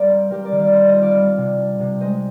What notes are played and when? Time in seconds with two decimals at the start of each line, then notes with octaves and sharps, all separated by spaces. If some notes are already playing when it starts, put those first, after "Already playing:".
Already playing: G3 A#4 C5 D5 F5
0.09 C4
0.30 G3 G4 A#4
0.44 A#4 D5
0.52 D#3
0.59 D5 F5
0.73 C4 C5 D#5
0.87 C5 D#5
0.94 F4
1.02 D5 F5
1.16 G3
1.38 C3
1.58 D4
1.80 C3
2.00 G#3 C5 D#5